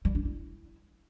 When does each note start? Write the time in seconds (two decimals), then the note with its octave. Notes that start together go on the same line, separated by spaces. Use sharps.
0.05 G3
0.15 D4
0.25 E4